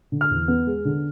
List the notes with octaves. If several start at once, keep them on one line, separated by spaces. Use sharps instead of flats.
D3
F6
E2
B3
G#3
D3